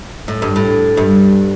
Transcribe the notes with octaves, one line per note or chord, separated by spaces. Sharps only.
A2
G2
A2
G2